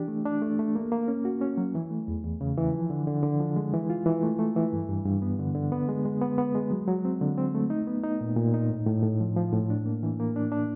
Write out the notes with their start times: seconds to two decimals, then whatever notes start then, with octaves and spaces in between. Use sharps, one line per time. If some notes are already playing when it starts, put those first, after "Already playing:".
Already playing: E3 D4 G4
0.08 A3
0.25 D4
0.42 A3
0.59 A3
0.75 A#3
0.92 A#3
1.08 C#4
1.25 F#4
1.41 C#4
1.57 F#3
1.75 E3
1.91 A3
2.08 E2
2.23 E2
2.41 C#3
2.57 E3
2.73 F3
2.90 D3
3.07 D3
3.23 D3
3.40 F3
3.56 G#3
3.73 E3
3.90 F4
4.06 E3
4.23 A3
4.39 A3
4.56 E3
4.73 G2
4.89 G2
5.05 G2
5.22 B3
5.39 D3
5.55 D3
5.72 B3
5.89 G#3
6.05 G#3
6.21 B3
6.38 B3
6.55 G#3
6.71 F#3
6.88 F#3
7.05 C4
7.21 D3
7.38 C4
7.55 A3
7.70 D#4
7.87 B3
8.03 D#4
8.21 A#2
8.36 A#2
8.54 D#4
8.70 A2
8.87 A2
9.03 A2
9.20 F3
9.37 F3
9.53 A2
9.70 D4
9.86 A#3
10.03 E3
10.20 A#3
10.36 D4
10.52 D4